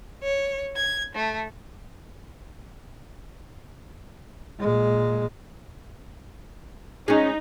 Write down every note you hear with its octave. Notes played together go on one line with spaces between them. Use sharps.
C#5
G#6
A3
A#2 G#3
G#3 C#4 D#4